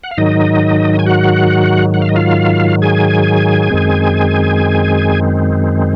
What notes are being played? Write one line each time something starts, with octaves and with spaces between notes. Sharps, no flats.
F#5
F5
G#2 D#3 F#3 D#4 D#5
G#5
F#4 F#5
F#5
F5
D#5
F4 F5
G#4 G#5
F#2 D#3 G#3 C4